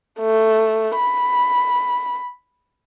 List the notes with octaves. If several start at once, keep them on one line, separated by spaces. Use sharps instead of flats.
A3
B5